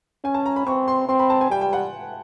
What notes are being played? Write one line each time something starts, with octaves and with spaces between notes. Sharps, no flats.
C#4 G#5
A5
A#5
B5
C4 C#6
C6
C4 C6
B5
A5
G#5
G3 G5
G5
F#5